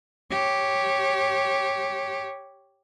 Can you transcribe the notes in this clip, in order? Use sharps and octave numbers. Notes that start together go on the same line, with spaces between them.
G4 C#5